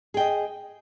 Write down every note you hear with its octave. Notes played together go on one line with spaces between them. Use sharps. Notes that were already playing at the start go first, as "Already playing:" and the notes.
G#4 D#5 G5